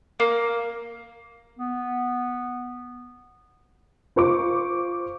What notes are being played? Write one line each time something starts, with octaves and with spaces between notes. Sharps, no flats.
A#3
B3
F4 C5 C#6 D6